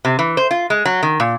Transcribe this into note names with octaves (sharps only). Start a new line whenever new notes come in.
C3
E3
C5
F4
G#3
F#3
D#3
A#2